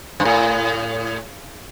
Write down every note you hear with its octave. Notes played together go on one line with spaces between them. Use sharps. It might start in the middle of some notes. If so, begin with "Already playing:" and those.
G2
A2